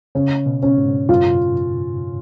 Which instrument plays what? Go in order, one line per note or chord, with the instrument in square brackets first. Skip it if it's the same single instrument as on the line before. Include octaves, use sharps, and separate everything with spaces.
[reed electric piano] C#3 [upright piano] C#4
[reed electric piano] B2
[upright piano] C#4
[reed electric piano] G#2
[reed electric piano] F#2 [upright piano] F4